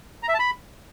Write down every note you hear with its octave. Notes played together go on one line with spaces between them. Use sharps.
A#5
E5
A5
B5